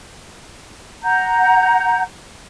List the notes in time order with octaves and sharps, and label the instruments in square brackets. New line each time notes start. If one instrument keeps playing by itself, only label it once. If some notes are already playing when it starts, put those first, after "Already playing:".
[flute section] F#5 A#5 G6